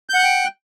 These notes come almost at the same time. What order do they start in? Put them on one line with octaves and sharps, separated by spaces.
G6 F#5 F#6 G5